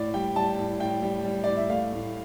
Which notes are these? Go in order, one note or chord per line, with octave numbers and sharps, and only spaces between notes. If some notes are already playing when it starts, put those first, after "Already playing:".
Already playing: A2 D5
G3 G5
G3 A5
A2
A2 G5
G3
G3
A2 D5
E5
A3 F5
A2